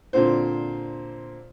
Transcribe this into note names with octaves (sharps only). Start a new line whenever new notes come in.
A#2 D3 C4 C5